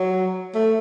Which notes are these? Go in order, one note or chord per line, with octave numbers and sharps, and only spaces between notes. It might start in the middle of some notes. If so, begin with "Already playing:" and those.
Already playing: F#3
A3